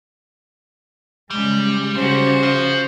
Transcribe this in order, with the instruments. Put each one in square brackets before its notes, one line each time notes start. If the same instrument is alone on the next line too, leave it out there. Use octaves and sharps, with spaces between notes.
[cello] C#3 G#3 [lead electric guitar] G3
[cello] C#3 [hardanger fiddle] F#4 C5
[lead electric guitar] F3